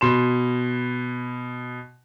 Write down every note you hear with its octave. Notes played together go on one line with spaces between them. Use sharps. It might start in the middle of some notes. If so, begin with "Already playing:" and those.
B2 C6 E7